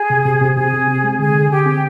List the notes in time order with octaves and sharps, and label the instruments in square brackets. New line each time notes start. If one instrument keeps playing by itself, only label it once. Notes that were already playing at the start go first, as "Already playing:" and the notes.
Already playing: [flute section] G#4
[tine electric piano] C3
C3
C3
[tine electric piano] C3 [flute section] G#4
[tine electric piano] C3
C4
G#3
[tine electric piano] D3 [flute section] G#4
[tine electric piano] D3
[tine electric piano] D3 [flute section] G4
[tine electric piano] C4